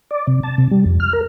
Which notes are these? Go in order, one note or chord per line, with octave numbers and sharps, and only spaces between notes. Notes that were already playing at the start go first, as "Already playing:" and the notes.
D5
C3
A5
C3
G3
F2
F6
A#4